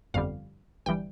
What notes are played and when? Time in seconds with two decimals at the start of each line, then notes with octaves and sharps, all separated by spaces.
0.14 G1 F2 D3 G3 F5
0.86 G1 E3 G3 G5